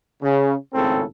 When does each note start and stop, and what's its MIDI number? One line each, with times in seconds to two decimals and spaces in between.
0.22 0.54 49
0.74 1.03 32
0.74 1.03 45
0.74 1.03 49
0.74 1.03 60
0.74 1.03 69